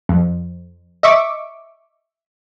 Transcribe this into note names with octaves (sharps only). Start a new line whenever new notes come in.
F2
D#5 E5 C#6 D6